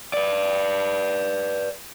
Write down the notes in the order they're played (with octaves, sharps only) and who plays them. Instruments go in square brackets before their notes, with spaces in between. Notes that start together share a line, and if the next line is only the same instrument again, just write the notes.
[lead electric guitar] B4 D5